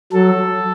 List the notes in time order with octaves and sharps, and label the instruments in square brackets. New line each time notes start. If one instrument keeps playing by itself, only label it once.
[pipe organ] F#3 A4